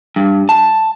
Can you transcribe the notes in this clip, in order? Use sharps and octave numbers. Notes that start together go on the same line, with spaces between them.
G2
A5